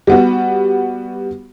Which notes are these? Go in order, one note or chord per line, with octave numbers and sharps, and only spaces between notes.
G3 B3 F#4